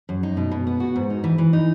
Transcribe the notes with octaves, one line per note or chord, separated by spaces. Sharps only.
F#2
D#4
B2
B2
B3
F#4
G#2
D#4
E3
E3
D#4